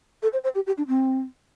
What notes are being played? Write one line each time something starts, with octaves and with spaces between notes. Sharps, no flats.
A4
C5
C5
G4
G4
D4
C4